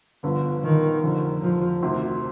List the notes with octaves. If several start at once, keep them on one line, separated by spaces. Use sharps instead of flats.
G1 G2 D3 F3 B3
D#3
F1 F2 D3
F3
D2 C3 D#3